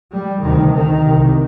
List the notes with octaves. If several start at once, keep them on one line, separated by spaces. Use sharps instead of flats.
G3
D2 C3 D#3
D#3
C2 C3